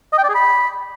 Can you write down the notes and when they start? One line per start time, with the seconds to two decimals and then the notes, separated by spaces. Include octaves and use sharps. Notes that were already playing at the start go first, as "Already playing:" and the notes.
0.13 D#5
0.18 G5
0.24 D5
0.29 G#4
0.35 B5